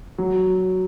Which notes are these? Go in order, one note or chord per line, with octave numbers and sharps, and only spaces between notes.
F#3